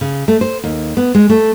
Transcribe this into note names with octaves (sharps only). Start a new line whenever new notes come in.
C#3
A3
C5
D#2
B3
G#3
A3